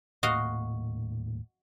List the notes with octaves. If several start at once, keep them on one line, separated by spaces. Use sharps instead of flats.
D#1 A2 A#3 F#4 D#5 F5